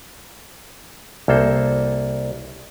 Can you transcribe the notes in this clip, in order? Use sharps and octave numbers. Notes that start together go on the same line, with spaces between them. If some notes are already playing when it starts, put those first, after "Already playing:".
C2 A#3 A4 C5